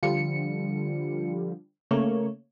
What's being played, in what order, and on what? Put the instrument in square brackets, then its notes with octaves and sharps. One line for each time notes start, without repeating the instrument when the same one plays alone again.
[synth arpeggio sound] D3 F3 G3 [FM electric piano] F4 C#7
[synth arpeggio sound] C#3 A#3 C#5 [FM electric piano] A3